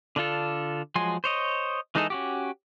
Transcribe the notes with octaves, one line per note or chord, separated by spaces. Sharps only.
D3 D4 F4 A4
F3 F#3 G#3 G#5 C6
C5 C#5 D#5
E3 G#3 D#4 G#4 A4
C#4 F#4 G4